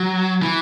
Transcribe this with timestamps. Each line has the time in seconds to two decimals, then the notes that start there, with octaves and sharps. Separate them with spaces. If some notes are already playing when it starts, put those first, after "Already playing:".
Already playing: F#3
0.42 E3